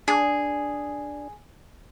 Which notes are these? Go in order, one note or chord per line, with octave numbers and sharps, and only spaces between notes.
D4 G#4